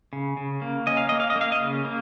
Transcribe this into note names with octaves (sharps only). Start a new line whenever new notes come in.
C#3
C#3
A#3
C#4 D#5
F5
A#3 D#5
F5
D#5
A#3
F5
D#5
C#3
A#3